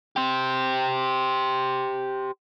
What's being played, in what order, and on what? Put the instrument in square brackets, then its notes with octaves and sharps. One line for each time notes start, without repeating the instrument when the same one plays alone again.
[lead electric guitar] G4 C5